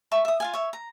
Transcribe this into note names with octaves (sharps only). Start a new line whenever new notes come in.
E5 A5 C#6
E5 D#6
F4 F5 G#5
C#5 E5
A#5